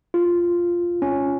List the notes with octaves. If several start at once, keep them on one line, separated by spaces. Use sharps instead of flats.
F4
C#4